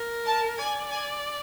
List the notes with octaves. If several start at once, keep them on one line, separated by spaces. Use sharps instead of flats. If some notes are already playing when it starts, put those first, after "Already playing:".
Already playing: A#4
A5
D5 G#5
G#5